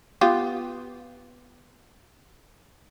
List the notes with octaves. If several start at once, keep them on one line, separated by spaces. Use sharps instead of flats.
B3 F4 G4